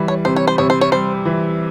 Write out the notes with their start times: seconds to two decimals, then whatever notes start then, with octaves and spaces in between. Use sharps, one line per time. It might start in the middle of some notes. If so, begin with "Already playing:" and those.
Already playing: E3 G3
0.08 C#5
0.25 C3 C5
0.36 C#5
0.47 C5
0.58 C3 C#5
0.70 C5
0.81 C#5
0.91 G3 C5
1.25 E3